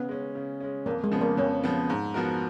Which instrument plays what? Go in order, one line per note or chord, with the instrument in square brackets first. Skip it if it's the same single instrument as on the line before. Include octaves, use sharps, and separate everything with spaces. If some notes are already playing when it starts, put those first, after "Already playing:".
Already playing: [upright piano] C#3 [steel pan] B3
[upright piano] G#3 C#4
C#3
G#3 C#4
[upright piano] F2 [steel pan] A#3
[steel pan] G#3
[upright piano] C#3 F3 B3
[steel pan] A#3
[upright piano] F2 [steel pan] C#4
[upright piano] C#3 F3 B3
G#2
F3 B3 F#4 A#4